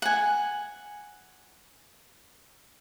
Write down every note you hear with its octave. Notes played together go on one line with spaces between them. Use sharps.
F#5 G#5